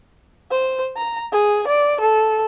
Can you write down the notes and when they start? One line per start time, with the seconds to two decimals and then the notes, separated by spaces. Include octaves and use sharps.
0.51 C5
0.97 A#5
1.33 G#4
1.68 D5
2.00 A4